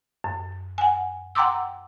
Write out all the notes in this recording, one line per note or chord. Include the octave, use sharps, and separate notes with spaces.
F#2
F#5 G#5
F#5 G5 A#5 C6 D6 E6